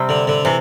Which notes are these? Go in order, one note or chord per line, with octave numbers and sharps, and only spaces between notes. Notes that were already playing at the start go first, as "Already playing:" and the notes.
Already playing: C3 G3 C4
D3
D3
C3 E3